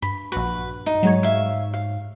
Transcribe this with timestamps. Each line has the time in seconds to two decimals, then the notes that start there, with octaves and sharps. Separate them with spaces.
0.02 G2 B5
0.32 A#1 F#4 B4
0.86 D#4
1.03 G#2 F#3 G#3 C#5
1.23 E5 F5
1.74 F5